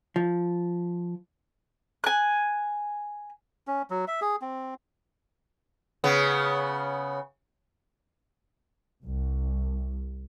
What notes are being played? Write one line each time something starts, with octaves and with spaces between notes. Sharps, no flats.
F3
G#5 F#6
C#4
F#3
E5
G#4
C4
C#3 B3
C2